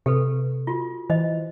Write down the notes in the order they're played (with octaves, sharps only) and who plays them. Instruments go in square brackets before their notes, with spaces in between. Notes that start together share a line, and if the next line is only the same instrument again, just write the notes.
[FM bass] C3 [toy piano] G4 A4 B4
[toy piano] F4 F#4
[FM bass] E3 [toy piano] C5 D#5